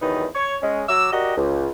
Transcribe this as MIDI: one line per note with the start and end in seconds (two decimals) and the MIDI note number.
0.01 0.26 40
0.01 0.26 43
0.01 0.26 51
0.01 0.26 54
0.01 0.26 63
0.01 0.26 71
0.35 0.57 73
0.62 0.83 56
0.62 0.83 61
0.88 1.09 54
0.88 1.09 86
0.88 1.09 88
1.12 1.32 66
1.12 1.32 67
1.12 1.32 70
1.12 1.32 74
1.12 1.32 75
1.12 1.32 79
1.36 1.70 37